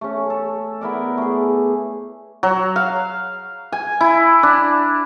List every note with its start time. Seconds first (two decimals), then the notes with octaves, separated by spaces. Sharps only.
0.01 A3 C#4
0.30 A4
0.81 B3 E4 A#4 D5
1.18 A3 G#4
2.43 F#3
2.76 F5
3.72 G#5
4.01 E4
4.43 D4